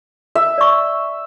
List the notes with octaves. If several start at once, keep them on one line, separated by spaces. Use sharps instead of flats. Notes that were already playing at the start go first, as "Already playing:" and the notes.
E5
D5 C#6